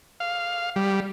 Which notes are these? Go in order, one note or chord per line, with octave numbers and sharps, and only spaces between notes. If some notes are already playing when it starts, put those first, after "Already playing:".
F5
G3